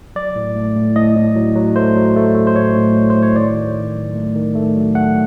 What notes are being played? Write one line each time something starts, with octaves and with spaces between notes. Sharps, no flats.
F#3 D5
A2
A3
A2
A2 D#5
A2
F#3
F#3
A3 C5
F#3
A3
A3
C5
A2 C#5
A2
A2
C5
A2
C#5
D#3 D5
D#3
D#3
F#3
A3
D#3
A3
F#3
A3 F#5